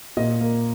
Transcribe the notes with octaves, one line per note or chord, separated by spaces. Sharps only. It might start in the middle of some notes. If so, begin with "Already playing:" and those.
A#2 D#5
A#3